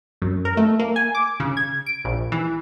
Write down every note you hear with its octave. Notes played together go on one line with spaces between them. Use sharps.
F#2
A#4
A3
A#3
G#5
D6
C#3
G#6
D7
A#1
E3